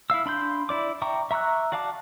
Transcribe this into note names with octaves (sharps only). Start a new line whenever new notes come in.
E4 E5 F5 E6
D4 B5 C6 G6
E4 D5 D6
E5 G5 A#5 C#6 D6
E5 A#5 C#6 E6 F#6
F#4 D5 F5 A5 D6